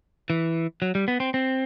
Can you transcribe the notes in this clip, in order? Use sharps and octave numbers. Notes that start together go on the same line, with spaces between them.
E3
F#3
G3
B3
C4
C4